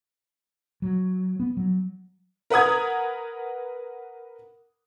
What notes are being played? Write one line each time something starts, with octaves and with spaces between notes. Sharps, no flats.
F#3
B3
F#3
A#4 B4 F#5 D#6 G#6